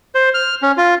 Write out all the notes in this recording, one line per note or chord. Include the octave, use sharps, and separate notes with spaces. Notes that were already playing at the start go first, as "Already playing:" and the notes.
C5
F6
C#4
F4